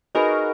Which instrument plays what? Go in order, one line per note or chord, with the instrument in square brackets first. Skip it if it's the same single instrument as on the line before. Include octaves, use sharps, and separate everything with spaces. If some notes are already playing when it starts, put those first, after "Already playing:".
[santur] D#4 G#4 B4 [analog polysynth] F#4 A#4